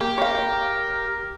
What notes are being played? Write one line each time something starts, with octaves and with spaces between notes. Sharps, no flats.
A#3 G4
A#4 C#5 F5